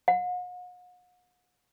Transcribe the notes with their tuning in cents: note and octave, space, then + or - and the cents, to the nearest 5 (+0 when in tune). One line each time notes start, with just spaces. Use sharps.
F#5 -45